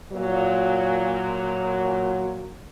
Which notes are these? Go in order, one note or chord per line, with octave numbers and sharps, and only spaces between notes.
A#2 F#3